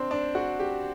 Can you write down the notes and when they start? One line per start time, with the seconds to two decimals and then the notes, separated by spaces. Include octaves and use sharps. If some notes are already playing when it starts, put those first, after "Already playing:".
Already playing: C4 D4
0.11 D4
0.35 F#4
0.60 G4